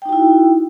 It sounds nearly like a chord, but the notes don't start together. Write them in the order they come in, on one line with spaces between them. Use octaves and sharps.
G5 D#4 F#4 E4